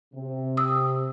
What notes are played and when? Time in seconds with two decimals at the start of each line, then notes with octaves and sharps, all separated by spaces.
0.13 C3
0.57 D#6 E6